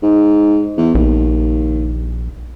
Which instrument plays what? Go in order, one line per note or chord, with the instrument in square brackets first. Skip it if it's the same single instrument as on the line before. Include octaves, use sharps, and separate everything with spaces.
[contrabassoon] G#2
E2
[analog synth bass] A#1 [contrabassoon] D#2